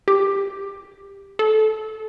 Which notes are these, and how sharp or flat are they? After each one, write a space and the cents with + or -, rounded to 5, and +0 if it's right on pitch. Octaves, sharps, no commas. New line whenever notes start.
G4 +15
A4 -15